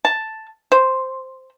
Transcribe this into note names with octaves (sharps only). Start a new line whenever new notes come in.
A5
C5